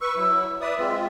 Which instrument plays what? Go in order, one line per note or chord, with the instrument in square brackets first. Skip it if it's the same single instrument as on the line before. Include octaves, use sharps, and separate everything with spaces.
[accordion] B4 C#6 [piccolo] E6
[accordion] F#3 E4
[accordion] B4 D5 D#6 [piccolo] E5
[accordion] G#3 C4 F4